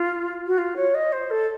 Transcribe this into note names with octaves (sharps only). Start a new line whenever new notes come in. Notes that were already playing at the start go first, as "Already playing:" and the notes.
Already playing: F4
F#4
F4
C#5
D#5
C5
A4